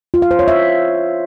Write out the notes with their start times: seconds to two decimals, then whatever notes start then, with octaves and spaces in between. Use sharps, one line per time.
0.14 F4
0.22 F5
0.31 C5
0.39 C#5
0.48 E5